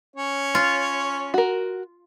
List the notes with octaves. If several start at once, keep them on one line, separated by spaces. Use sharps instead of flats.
C#4 C#5
F4
F#4 A#4